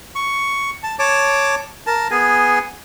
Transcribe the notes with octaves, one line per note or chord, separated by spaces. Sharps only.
C#6
A5
C#5 A5 D6
A#4 A5
B3 G#4 G#5